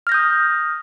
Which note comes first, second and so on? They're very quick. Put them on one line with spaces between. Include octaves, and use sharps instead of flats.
F6 A#6 G6 D#6